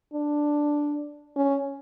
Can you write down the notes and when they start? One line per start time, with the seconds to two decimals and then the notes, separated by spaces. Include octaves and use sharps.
0.13 D4
1.36 C#4